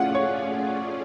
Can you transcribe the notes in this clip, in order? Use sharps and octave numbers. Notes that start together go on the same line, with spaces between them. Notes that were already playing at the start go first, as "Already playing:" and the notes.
Already playing: A3 C#4 F4 G#4 D5 F5 F#5
C#5